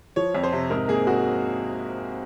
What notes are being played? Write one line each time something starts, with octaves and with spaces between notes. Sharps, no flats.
F3 C#5
F2
C5
C3
G#2 A#4
A#3 G#4
G#2 F#4